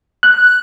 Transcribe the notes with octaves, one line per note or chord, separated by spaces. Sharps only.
F#6